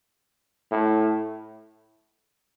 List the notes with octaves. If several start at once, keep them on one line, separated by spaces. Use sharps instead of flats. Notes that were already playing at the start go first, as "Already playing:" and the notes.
A2